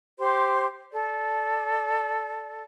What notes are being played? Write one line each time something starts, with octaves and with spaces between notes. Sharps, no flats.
G4 C5 C6
A4 D5